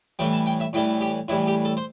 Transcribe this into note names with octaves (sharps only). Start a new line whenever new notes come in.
A2 E3 G3 G5
A5
G5
E5
A2 E3 G3 G5
G4
A2 E3 G3 E4
G4
A4
C5